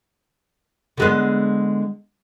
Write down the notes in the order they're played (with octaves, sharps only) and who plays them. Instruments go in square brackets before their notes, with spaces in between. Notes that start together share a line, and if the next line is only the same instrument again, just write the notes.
[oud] D3 G#3 B3